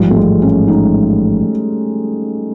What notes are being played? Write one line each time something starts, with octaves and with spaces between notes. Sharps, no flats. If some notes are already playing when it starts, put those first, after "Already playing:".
Already playing: A1 G#2 F3 G3
A3
G#3
C#4
D#4